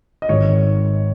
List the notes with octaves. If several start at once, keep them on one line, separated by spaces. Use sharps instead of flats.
D#5
G#1 G#2 D#3 C#5